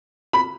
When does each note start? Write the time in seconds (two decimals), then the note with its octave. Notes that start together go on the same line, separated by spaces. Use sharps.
0.33 B5